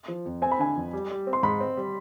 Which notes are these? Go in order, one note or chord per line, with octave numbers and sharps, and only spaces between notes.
F3
F2
C4 G#5
B5
D3 G#5
F2
G3
G3
C4
C6
G#2 B5
C4
G3